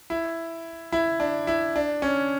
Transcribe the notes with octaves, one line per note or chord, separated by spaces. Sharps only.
E4
E4
D4
E4
D4
C#4